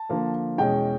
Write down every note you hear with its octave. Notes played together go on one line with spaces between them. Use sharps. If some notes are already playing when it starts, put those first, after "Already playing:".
Already playing: A5
D3 F3 A#3
E2 B2 G#3 C#4 G5